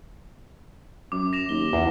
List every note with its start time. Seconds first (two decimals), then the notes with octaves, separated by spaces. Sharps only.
1.12 F#2 D6
1.33 A#6 E7 F7
1.49 D#2 G7
1.73 E2 E3